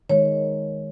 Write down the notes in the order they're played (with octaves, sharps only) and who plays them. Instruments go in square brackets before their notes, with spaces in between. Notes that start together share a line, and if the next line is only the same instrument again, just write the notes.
[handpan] D#3 G#3 [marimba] C#5